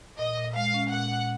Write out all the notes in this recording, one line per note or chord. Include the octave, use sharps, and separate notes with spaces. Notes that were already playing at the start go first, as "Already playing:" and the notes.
A#2 D#5
A#2
G#3 F5
C#4
A#2 F#5
A#2